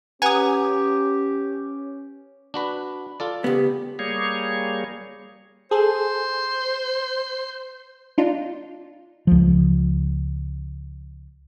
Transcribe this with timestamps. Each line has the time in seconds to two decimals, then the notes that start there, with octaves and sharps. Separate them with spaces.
0.22 C#4 G4 B4 F#5 G#5 A#5 D#6
2.54 D4 F#4 B4
3.20 F4 A4 D5
3.44 C#3 B3 G4
3.99 G3 A#3 G#4 C#5
5.71 G#4 A4 C5
8.18 D4 D#4 F4
9.27 C#2 F3